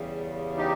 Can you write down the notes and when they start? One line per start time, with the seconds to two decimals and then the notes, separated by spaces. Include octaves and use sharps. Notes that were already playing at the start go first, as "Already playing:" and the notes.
Already playing: E2 C#3 G3
0.57 D#4 G4